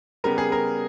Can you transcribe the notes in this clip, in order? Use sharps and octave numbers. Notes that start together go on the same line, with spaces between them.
C#3 G3 B3 A#4
G#4
A#4